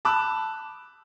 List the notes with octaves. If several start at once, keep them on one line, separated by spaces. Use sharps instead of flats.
A5 B5 D6 E6 F#6